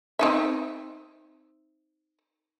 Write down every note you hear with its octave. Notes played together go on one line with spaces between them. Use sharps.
C4 D#4 E5